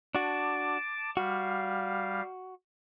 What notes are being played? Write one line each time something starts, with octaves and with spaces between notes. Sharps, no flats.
D4 F#4 A5 D6
G3 F#4 F5